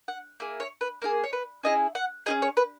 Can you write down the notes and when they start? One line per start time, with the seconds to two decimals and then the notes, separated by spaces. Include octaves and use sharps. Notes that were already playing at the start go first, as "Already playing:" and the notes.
0.08 F#5
0.40 A#3 E4 G#4
0.60 C#5
0.81 B4
1.02 A#3 E4 G#4 A#4
1.24 C#5
1.33 B4
1.63 C#4 E4 G#4 D#5
1.95 F#5
2.26 C#4 E4 G#4 D#5
2.42 C#5
2.57 B4